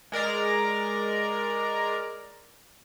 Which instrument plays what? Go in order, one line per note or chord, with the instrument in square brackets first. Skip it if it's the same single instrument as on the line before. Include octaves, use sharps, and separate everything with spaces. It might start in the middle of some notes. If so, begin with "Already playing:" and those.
[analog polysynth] G#3 A#4 D5 A#5